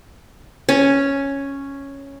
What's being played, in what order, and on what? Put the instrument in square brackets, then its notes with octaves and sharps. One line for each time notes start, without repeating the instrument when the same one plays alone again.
[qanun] C#4